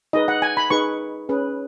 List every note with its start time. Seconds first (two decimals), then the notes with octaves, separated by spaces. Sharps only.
0.13 D#4 G#4 B4 D#5
0.28 F#5
0.42 G#5
0.57 B5
0.70 D#4 G#4 B4 C#6
1.29 C#4 G#4 B4